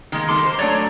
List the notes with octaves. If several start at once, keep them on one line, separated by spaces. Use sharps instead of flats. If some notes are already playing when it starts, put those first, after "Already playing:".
D#3 G#3 A#3
G3 A#3 A4 C6 D6
C5
F#3 A3 D4 C#5 D5